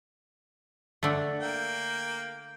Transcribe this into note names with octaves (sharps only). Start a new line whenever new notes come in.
D3 A3
A#3 G5